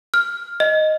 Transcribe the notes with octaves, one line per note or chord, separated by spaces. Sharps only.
F6
D#5